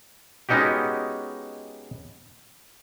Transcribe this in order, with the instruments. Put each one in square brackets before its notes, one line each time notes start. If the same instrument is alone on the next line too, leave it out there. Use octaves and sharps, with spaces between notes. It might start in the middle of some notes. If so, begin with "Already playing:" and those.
[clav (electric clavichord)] G#3 B3 C#4 D#4 F#4 G4